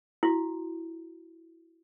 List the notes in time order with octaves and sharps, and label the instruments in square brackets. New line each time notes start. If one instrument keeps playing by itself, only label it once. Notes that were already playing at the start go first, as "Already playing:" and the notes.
[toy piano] E4 F#4